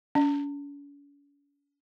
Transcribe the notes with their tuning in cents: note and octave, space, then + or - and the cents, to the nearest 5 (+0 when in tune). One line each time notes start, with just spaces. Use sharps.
C#4 +45